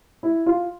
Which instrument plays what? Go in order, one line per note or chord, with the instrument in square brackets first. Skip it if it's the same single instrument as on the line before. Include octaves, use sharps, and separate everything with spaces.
[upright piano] E4
F4